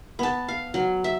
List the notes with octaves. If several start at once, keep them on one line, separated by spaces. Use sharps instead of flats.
B3 A5
F5
F#3
E5